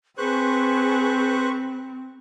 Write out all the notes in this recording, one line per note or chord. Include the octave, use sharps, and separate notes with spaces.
C4 G#4 B4 C5 C#6 F#6